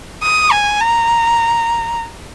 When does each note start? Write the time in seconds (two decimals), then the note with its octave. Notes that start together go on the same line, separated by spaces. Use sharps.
0.23 D#6
0.52 G#5
0.81 A#5